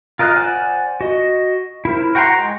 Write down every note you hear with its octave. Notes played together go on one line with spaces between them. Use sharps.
F4 A#4 D#5 F5 F#6
C5 D5 F#5 G#5
F#4 D#5
E4 A#4 C5
F#4 F#5 G5 A#5 C6
G#3